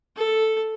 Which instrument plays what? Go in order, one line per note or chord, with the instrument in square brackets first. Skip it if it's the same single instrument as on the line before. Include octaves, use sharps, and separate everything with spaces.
[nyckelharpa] A4